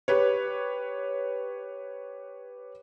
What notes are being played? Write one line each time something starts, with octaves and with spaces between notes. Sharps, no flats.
G4 B4 C#5